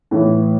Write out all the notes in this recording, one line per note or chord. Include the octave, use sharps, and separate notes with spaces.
A2 E3